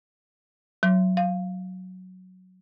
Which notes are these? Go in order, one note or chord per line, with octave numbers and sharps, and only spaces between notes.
F#3
F5